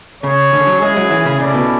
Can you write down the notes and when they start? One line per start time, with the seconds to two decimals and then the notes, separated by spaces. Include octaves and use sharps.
0.23 C#3 C#4 G#4 C#5
0.53 D3
0.67 F#3
0.81 G#3 C#4 E4 G#4
0.96 F#3
1.10 E3
1.25 C#3
1.40 C#3 C#4 E4 A4 D5
1.54 B2